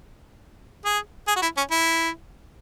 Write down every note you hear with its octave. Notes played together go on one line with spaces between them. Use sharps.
G#4
G#4
F#4
E4
C#4
E4